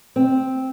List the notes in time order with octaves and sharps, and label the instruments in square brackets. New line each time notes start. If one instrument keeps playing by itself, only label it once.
[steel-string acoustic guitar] C4